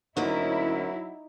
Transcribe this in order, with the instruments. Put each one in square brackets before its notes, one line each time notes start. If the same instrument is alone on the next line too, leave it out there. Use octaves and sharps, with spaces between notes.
[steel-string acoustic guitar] D2 A#3 C#4 [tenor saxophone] F#3 [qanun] D#4 D5 [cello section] E4